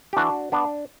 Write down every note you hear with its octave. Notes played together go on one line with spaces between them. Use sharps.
G4
E3 D4 F#4
B3 D4